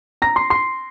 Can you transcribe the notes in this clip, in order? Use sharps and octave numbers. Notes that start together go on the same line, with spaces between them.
A#5 A#6
C6 C7
C6 C7